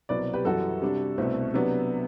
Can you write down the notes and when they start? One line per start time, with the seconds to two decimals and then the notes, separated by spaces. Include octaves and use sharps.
0.09 C2 B2 F#3 C4 B4 D5
0.33 G4 B4
0.45 F#2 E3 G3 F#4 A4
0.82 C3 G3 D4
1.18 C2 B2 A3 C4
1.54 C3 F#3 B3 D4